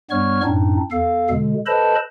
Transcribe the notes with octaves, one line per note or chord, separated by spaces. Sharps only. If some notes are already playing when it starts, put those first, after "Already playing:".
G2 G3 B3 C#5 C#6 F6
F#2 A2 C4 D4 D#4
E2 A4 F5
B2 D3 G#3
A4 B4 C5 D#5 A5 B5